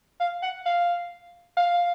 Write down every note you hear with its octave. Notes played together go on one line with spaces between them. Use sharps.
F5
F#5
F5
F5